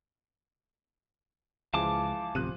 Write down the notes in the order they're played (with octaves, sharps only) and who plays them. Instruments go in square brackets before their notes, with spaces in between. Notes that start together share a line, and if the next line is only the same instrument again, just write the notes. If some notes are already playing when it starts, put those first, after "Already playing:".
[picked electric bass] C#2 [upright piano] E3 F3 G#3 [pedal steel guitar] F5 A5 D6
[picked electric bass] D1 A1 C3 [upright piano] F3 F#6 D#7